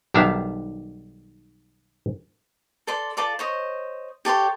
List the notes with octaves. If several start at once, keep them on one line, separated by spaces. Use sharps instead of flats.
B1 D#3 G3 D4 E5 F5
A4 D5 C6
F4 A4 D5 D6
C5 C#5 D#5
G4 A4 C#5 C6